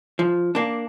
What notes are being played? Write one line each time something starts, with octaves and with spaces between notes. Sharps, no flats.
F3
A#3 D4